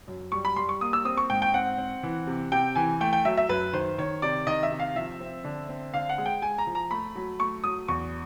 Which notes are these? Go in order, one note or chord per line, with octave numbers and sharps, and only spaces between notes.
F#2
G3 C#6
B5
G3 C6
C#6
A#3 D#6
E6
C4 D#6
C#6
G#2 G5
G5
C4 F#5
C4
E3
C3
C3 G5
E3 G#5
A3 G5
G5
F#3 E5
E5
F#2 B4
D#3 C5
D#3 C#5
C3 D5
D#3 D#5
E5
C3
F5
F3 E5
C4
D3
C4
D3 F5
F#5
G#3
G5
G#3 G#5
A#5
F3
A#5
A3 B5
F#3
A3 C#6
F#3 D#6
E2 C#6